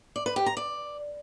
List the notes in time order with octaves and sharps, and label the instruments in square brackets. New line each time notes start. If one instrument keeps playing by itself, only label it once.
[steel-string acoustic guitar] D5
B4
G4
A#5
D5